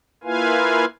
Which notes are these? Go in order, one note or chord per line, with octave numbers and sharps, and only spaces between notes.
A#3 E4 F4 B4 F5 G#5